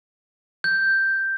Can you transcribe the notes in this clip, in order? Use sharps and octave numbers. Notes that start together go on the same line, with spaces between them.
G6